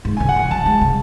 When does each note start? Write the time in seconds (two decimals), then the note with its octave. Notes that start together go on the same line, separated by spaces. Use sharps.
0.05 G#2
0.17 C#3 G#5
0.29 F#5
0.36 E3 G#5
0.51 F#3 A5
0.66 G#3
0.81 C#3